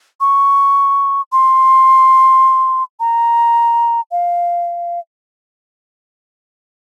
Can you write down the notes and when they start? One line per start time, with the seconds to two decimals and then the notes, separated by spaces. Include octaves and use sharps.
0.20 C#6
1.32 C6
3.00 A#5
4.11 F5